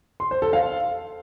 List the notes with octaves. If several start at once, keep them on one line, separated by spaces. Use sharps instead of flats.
C6
C5
A4
F5